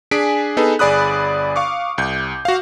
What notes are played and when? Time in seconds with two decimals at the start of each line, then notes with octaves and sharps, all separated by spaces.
0.11 D4 G#4 G#5 B6 D7
0.57 B3 D#4 G#4 A4 B4
0.79 G1 G#4 D5 B5 D#6 F#6
1.56 F5 C#6 D6
1.98 C2 G6
2.45 F#4 F5